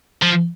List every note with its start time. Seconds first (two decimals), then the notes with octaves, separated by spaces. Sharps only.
0.22 F3